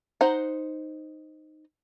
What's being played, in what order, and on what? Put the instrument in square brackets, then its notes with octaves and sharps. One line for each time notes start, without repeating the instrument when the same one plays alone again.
[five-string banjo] D#4 C5 F#5 A#5